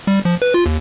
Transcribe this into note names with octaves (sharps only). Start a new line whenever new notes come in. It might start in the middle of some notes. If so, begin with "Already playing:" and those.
G3
F3
B4
F4
D#2